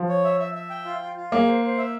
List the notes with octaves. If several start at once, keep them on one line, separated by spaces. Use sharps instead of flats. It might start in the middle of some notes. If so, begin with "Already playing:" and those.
Already playing: F3
C#5
E5
E5
E5
G5
F4
F4
F4
A#3 G#4
C5
C5
E5